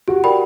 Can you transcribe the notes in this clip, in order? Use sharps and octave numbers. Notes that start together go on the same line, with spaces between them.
F#4 G4
A#4 D5 G5 B5